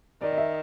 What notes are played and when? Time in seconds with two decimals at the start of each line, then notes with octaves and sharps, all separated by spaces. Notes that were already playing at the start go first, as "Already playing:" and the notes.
0.22 D#3 D5
0.32 D#5
0.38 E5